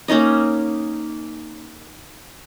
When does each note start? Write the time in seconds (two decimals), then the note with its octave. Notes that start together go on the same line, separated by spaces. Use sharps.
0.08 A#3 C#4 D#4 D#5